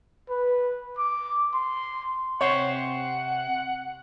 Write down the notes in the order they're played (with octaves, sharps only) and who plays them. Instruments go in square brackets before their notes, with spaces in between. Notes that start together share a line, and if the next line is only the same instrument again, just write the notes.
[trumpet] B4
D6
C6
[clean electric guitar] C3 C5 [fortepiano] C#5 [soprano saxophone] F#5